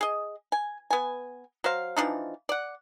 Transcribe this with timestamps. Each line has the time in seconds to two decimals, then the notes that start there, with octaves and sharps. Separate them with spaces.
0.01 G#4 D#5
0.52 G#5
0.90 B3 G#5
1.64 F#3 C5 F5
1.97 E3 F3 D4 D#4
2.49 D5 F#5